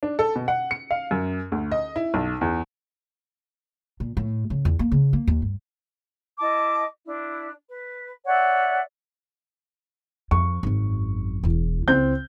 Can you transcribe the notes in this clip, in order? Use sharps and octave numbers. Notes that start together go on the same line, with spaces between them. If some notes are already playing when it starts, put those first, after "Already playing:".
D4
A4
B2
F#5
C#7
F5
F#2
D2
D#5
E4
B1
E2
A#2
A2
C#3
E2
A#3
C#3
A#3
D#2
G2
E4 D#5 A5 D6
D4 E4
B4
C#5 D5 E5 F#5
F2 C#6
G#1 F#2
E1 E2
C#2 C4 E4 G6